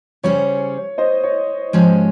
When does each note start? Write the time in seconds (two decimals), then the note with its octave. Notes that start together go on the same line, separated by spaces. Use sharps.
0.23 C#3 G3 C#4 G#4 C5 C#5
0.98 C5 D#5
1.23 C#5
1.73 G#2 F3 G#3 C#4 G4